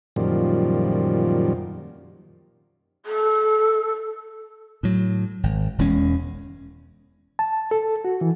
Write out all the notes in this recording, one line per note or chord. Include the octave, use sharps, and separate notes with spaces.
F#2 A#2 D#3 F3 G3
A4
A2 F#3
G#1
E1 E2 G#3 C#4
A5
A4
F#4
E3